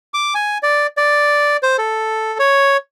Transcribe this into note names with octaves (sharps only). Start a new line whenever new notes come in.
D6
G#5
D5
D5
C5
A4
C#5